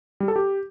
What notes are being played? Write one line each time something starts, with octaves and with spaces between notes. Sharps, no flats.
G3
A4
G4